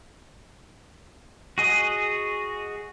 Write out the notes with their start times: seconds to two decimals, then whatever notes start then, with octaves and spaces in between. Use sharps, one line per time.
1.58 F#4 G#4 D#5